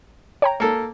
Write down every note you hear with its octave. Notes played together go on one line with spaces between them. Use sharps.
C#5 G5 A#5
A#3 A4